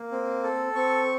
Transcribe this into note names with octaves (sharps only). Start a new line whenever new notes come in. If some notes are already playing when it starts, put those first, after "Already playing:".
Already playing: A#3
C4
A4
C4 C#6